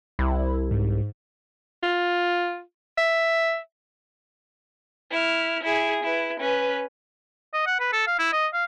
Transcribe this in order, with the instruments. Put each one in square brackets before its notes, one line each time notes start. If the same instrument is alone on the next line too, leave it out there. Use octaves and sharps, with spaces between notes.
[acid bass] C2 [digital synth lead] E4
[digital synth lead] G#2
[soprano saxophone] F4
E5
[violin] E4 F6
E4 G#4
E4 B4
C#4 B4
[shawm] D#5
F#5
B4
A4
F5
E4
D#5
F5